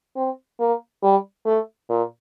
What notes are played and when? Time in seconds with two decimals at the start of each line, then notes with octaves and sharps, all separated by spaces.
0.16 C4
0.60 A#3
1.03 G3
1.45 A3
1.89 A#2